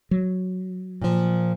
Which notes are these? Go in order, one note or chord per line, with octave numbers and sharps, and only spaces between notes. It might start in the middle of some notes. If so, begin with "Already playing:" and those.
F#3
A#2 F3